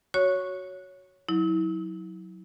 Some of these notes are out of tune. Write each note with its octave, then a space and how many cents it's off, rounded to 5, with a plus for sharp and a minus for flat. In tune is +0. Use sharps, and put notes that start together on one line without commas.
F#4 +0 C#5 +5 C#6 +0
F#3 -10 E4 -30